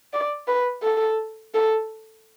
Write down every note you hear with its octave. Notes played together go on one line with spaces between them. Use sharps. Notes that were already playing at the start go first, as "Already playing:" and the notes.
D5
B4
A4
A4